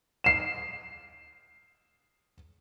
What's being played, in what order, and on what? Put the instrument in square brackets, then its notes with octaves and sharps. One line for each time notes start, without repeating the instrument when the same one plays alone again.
[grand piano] C7 E7